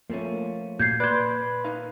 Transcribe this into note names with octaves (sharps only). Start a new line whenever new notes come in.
F3 A3 A#3 C#4
A#2 A#3 F#4 G6 G#6 C7
B4 D5 C6 F#6 G#6
D#4 A#4 F5